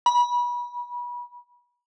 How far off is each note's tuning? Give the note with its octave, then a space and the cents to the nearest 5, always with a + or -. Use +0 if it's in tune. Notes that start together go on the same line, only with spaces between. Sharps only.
B5 -30